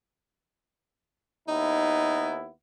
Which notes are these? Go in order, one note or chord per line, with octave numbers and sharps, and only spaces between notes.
D#2 B3 D#4 E4